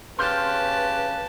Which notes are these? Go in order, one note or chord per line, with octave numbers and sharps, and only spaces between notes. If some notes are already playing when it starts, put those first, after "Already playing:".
C#3 G4 B4 A5 C6 F6 G6